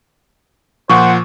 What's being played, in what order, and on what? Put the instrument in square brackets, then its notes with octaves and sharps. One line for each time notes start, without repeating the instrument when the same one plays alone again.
[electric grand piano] A#2 F3 [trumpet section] C5 F#5 [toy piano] C#6